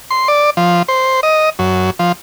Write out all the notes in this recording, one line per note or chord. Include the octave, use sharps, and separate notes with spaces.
C6
D5
F3
C5
D#5
F#2
F3